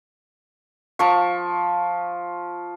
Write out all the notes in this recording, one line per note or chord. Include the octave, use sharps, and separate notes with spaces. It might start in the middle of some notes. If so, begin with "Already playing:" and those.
F3 C#6